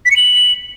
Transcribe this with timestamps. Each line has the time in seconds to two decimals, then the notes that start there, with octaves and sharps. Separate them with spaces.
0.06 B6
0.11 C#7
0.16 F#7